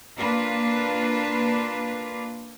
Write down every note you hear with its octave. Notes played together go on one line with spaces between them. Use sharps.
A#3 D4 F4 B4